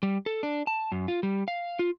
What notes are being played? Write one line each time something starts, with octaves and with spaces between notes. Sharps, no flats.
G3
A4
D4
A5
F#2
F4
G3
F5
F4